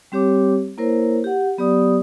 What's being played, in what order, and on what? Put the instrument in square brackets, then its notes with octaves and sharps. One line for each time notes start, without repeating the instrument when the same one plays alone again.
[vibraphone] G3 C4 G4 C#5 D6
A#3 E4 A#4 C5 C#5
G4 F#5
F#3 B3 G4 D5 D#6